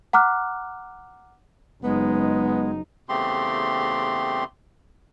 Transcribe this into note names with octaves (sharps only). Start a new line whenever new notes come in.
F#5 A#5 D6 F6 F#6
F#1 G#3 B3 D#4
E2 C#3 A3 C4 G4 C6